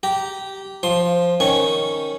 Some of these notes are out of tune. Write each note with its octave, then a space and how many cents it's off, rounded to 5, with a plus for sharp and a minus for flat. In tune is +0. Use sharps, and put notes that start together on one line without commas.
G4 -15 A#5 +0
F3 +0 C6 +15
D#3 +0 C#4 +0 C#6 -15